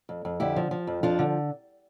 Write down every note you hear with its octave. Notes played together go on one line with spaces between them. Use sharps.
F2
F2
D3 E4 G4
F3
F3
F2
F3 D4 F4
D3